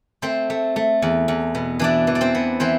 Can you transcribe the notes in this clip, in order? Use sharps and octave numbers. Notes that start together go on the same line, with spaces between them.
A3 C4 C5
A3
A3
E2
E2
B2
E3 D4 D5
E3
D5
C4 C5
B3
E3 C4 C5